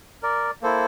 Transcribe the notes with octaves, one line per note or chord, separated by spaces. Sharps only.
A#4 D5
A#3 E4 A4 C5